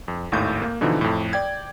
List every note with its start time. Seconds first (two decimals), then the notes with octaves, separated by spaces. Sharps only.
0.08 F2
0.32 G#1 D#2 A2 G6
0.62 A#3
0.81 B2 D3 E3 F3 D#4
1.01 F2 A2
1.33 D5 G5 G#6